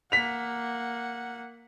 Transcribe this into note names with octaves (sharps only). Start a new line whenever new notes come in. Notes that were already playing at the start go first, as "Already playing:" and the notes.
A#3 F#5 B6 F7